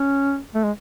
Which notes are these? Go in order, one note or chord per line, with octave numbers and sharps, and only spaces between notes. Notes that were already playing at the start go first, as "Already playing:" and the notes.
Already playing: C#4
A3
G#3